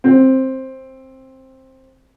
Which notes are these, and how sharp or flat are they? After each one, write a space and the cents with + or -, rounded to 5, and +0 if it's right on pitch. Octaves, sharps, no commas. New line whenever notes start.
C4 +10